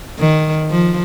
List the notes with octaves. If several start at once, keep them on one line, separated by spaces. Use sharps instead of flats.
D#3
F3